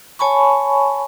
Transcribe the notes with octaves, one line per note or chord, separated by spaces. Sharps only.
C#5 G#5 A5 B5 C#6